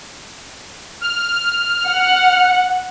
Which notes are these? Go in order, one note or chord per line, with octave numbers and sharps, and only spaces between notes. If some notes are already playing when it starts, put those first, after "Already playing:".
F6
F#5